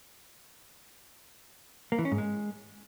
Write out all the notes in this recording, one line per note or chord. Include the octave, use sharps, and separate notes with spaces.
A#3
E3
C#4
G#2
G#3